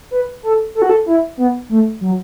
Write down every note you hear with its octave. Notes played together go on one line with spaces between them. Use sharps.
B4
A4
A4
F#4
A4
E4
B3
A3
F#3